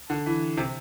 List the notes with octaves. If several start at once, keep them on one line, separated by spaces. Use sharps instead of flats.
D3
E3
C3